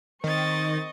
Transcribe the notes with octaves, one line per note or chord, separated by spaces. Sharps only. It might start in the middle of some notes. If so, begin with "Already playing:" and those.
D#3 C4 D#5 C#6 A6